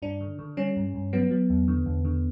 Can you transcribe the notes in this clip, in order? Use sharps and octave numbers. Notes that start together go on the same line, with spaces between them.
G2 D4
D3
D3
G3 C#4
G2
G2
F#3 B3
F#3
E2
D3
E2
D3